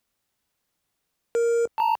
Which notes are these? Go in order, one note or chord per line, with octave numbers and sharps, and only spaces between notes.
A#4
A5 A#5